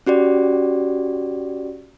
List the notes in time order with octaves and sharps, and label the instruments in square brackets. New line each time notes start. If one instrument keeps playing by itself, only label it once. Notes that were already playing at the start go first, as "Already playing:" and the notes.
[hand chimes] C#4 F#4 G4 D5